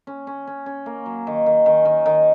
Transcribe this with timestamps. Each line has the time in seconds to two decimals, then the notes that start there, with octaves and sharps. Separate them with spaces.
0.07 C#4
0.27 C#4
0.47 C#4
0.66 C#4
0.86 A#3
1.06 F#3
1.27 D#3
1.46 D#3
1.66 D#3
1.85 D#3
2.06 D#3